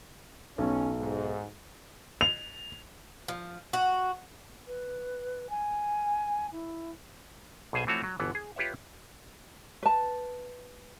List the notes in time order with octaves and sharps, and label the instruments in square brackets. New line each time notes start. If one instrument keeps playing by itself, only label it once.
[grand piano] B1 [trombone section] C#4
[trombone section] G#2
[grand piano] F7
[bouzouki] F3
F#4
[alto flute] B4
G#5
E4
[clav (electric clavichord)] B1 B2 G#4 C5 G#5
E3 F3 A3 C4 F#4 C#5
F#3
G1 B2 E3 B3
G#4
F4 G4 B4 C#5 E5
[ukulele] B4 A5